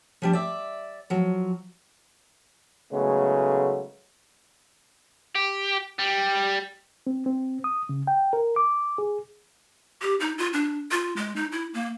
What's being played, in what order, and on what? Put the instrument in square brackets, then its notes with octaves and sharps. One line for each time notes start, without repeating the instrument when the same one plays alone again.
[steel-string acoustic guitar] F3 G3 D4
D5 E5
F3 F#3
[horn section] A2 C#3 F#3 G#3 A3 B3
[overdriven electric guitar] G4
G3
[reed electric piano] C4
C4
D#6
C#3
G5
A#4
D6
G#4
[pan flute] G4
D#4
F4
D4
F4
G#3
D#4
E4
A#3